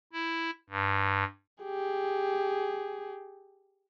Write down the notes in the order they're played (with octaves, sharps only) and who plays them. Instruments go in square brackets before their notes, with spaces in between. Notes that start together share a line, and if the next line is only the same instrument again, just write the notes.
[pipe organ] E4
G2
[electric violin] G4 G#4